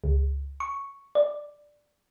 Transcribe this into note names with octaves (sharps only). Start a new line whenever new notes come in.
C#2
C#6
D5